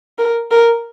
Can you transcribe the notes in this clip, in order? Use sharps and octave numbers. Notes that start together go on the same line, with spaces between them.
A#4
A#4